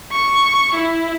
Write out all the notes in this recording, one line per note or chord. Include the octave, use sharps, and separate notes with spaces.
C#6
E4